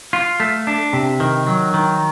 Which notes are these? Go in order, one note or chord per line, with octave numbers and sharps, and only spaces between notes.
F4
A3
D4
C3
D#3
F#3
D#3